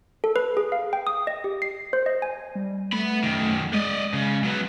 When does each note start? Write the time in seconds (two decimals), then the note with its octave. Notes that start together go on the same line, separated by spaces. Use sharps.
0.24 A4
0.36 B4
0.57 G#4
0.72 F5
0.93 G5
1.07 D#6
1.27 D#5
1.44 G4
1.62 C7
1.93 C5
2.06 D#5
2.22 G#5
2.55 G3
2.92 A3 B3 B5
3.24 F#2 D#3
3.73 G#3 D5 D#5
4.13 C#3
4.44 F#3 B3